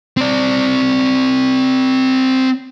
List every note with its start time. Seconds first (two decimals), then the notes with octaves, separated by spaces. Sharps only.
0.17 C4 D5